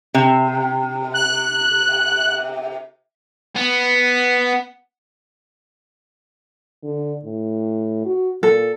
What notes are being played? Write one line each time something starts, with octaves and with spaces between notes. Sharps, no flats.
C3
F#6
B3
D3
A2
F#4
A#2 A4